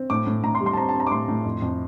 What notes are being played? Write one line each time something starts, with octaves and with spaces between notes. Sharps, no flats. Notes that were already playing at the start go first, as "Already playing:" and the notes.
Already playing: C4
A2 D6
A2
A2 A#5
C6
G3
C6
A5
C4 A#5
A5
C4
A#5
D6
A2 C6
A2
F2
F2